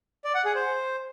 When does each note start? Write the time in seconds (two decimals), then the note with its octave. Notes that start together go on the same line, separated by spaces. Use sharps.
0.24 D5
0.35 F#5
0.45 G#4
0.55 C5